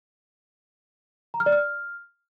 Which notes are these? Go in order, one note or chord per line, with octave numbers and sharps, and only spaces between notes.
A#5
F6
D5
F6